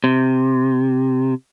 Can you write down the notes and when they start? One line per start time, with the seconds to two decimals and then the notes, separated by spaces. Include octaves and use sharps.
0.04 C3